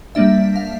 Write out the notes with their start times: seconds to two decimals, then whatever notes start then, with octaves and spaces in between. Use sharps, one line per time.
0.15 G3 A#3 D4 E5
0.56 F5